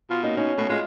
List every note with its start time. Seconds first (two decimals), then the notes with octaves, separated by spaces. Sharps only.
0.10 B2 F4
0.23 A#3 C#4 D#4
0.37 C#4 D#4
0.58 B2 A3
0.70 G#3 F4 D#5